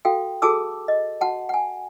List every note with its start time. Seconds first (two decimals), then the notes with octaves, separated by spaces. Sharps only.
0.05 F#4 A4 F5 G5
0.42 F#4 G#4 A4 A5 D6 E6
0.88 D#5
1.21 F#4 F#5 A5
1.49 F#5 G#5